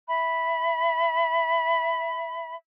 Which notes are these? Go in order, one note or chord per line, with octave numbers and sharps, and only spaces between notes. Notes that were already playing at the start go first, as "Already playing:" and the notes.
E5 B5